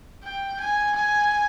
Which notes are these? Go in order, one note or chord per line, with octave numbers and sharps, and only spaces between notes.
G5
G#5
G#5